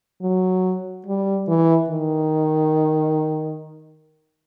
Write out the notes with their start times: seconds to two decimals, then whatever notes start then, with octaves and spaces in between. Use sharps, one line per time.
0.22 F#3
1.07 G3
1.48 E3
1.90 D#3